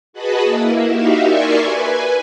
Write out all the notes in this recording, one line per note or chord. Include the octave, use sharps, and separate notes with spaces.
F#4 G#4 B4 D#5 A5 B5
A#3 E4
D#4 F#4 G4 E5 F5
A#4 D5 E5 G#5 C6 C#6
B4 G#5